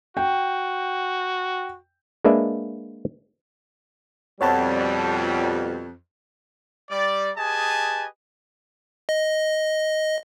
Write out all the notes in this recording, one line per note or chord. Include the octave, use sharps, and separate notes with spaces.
F#4 G5
G#3 A#3 D4 B4 D5 E5
F2 B2 G3 C#5 F#5 A5
G3 D5
G4 G#4 B4 D#5 G#5 A5
D#5